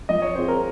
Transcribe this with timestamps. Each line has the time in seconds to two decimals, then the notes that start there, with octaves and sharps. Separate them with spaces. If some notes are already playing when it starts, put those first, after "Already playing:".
0.09 F3 D#5
0.22 C#5
0.35 C4 F4 G#4 C5
0.48 A#4